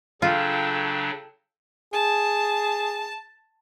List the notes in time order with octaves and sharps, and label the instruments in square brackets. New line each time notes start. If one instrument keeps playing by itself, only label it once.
[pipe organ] C#3 F#3 D4 [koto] F4 [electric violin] A4 G5
[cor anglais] G#4 [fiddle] A5